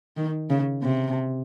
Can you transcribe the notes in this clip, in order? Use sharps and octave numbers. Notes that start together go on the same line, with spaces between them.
D#3
C#3
C3